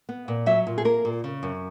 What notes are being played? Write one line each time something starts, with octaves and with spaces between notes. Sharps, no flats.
B3
A#2
F#3 E5
A#2
G#4
A#3 A#4
A#2
C#3
F#2